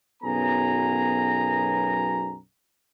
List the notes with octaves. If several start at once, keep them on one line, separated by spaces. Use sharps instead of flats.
B1 F#2 B3 G#4 A#5